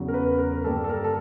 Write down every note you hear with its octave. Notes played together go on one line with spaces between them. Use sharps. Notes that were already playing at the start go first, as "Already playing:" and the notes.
Already playing: E2 C#3 F#3
A#4
B4
A#4
G2 D3 G3 A#3 A4
A4
A#4
A4